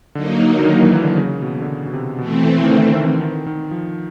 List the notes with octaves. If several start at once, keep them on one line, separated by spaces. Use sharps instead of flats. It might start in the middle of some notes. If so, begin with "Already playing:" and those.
D3 F#3 A#3 D#4
D3
D#3
E3
E3
D3
C#3
B2
D3
C#3
B2
C3
B2 E3 A3 C4
D#3
D3
D#3
D#3
D#3
F3